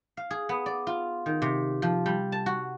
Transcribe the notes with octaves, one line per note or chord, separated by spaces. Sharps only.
F5
G#4
B3
D5
F4
D#3
C3
F3
G3
A5
F#4